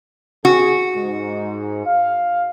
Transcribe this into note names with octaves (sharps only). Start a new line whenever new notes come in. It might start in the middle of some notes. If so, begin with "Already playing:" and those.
C3 C4 F#4 G#4
G#2
F5